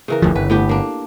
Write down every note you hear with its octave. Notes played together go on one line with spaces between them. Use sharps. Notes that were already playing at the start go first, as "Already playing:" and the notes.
C#3 E3 A#4
F#1 D2 F3
G1 B4
A2 B3 G4
A#3 D4